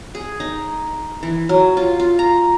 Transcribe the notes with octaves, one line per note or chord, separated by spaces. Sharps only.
G#4
D#4
E3
F#3
F4
F4
A#5